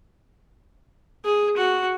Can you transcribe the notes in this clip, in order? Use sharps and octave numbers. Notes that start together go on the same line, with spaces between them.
G#4
F#4